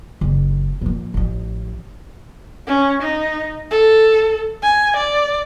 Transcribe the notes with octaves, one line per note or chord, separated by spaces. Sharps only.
F#1
A#2 F3
A1 F3
C#4
D#4
A4
G#5
D5